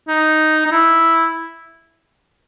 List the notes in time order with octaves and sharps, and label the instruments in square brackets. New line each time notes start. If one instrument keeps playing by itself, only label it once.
[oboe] D#4
D#4
E4